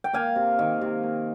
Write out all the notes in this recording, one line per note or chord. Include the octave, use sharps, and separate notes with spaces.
G5
A#3 F5 G#5
C3
D#3
C3
A#3